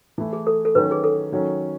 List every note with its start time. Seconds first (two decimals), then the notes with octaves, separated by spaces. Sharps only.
0.18 E3 A3 E4
0.33 G#4
0.47 A4
0.65 A4
0.75 D#3 F#3 C#4 F#4 B4 C#5
0.91 G#4
1.04 A4
1.32 D#3 F#3 C#4